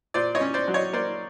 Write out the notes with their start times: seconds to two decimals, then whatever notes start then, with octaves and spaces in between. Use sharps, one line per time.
0.14 A#2 C5 D5
0.35 C#5 D#5
0.41 C#4
0.54 C5 D5
0.68 F#3
0.74 C#5 D#5
0.93 A#3 C5 D5